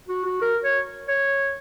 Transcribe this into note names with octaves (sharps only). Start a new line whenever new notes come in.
F#4
F#4
A#4
C#5
C#5